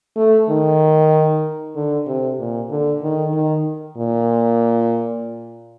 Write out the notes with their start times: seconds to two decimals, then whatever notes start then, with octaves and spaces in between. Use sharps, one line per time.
0.16 A3
0.49 D#3
1.76 D3
2.07 C3
2.39 A#2
2.70 D3
3.02 D#3
3.33 D#3
3.97 A#2